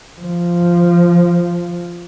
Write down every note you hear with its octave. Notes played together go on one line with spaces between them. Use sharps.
F3